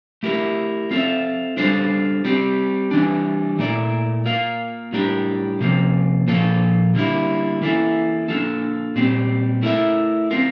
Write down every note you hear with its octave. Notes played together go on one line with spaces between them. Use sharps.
A3 E4 G4 A#4
C4 F4 A4 E5
G3 D4 F4 A4 C5
G3 C4 G4
E3 G3 D4
A#2 A3 E4 A#4 D5
A#3 F4 A#4 F5
A2 G3 D4 G4 A#4
C3 F3 A#3
A#2 F3 A#3 F4 A4
D3 G3 A#3 E4
E3 A#3 E4 A4 E5
A#3 D4 F4 A4
A#2 G3 C4 G4
A3 E4 A#4 E5
C4 F4 A#4